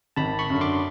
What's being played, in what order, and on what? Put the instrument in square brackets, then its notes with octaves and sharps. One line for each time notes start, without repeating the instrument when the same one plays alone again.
[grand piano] G#1 [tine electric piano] A5 B5
[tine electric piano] B5 C#6
[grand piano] F#2 D3
[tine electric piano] C6 D6